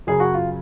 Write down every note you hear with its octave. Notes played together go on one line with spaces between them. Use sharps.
F#2 C#3 G#4
F#4
F4